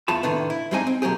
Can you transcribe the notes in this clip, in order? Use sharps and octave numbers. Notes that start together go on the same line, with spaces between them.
E2 F4 A5 B5
A2 D3 D#3 B3
E4
G2 G3 G#3 C4 D#4 G#5
C4
B2 F#3 A#3 G4 G#4